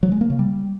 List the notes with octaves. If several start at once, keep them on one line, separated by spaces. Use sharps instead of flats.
F#3
G#3
A#3
C#3
G3